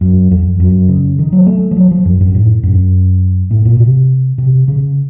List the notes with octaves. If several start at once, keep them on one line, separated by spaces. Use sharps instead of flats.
F#2
F2
F#2
C#3
D#3
F#3
A3
F3
F#3
F3
F#2
F#2
A2
F#2
A2
A#2
C3
C3
C#3